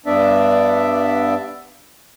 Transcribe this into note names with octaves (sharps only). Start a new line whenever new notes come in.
G2 B3 D4 D5 E5